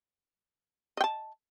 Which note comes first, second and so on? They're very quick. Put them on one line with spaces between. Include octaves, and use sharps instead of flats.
D#5 G5 A5